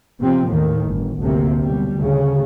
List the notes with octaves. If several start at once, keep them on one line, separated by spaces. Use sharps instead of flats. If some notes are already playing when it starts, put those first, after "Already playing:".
C3 F3 C4
D#2 A2 D#3
G1
G1 D2 C3 A#3
B1 G3
D2 C#3